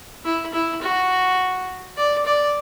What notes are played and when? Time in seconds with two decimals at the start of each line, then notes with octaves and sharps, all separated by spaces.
0.25 E4
0.53 E4
0.82 F#4
1.97 D5
2.25 D5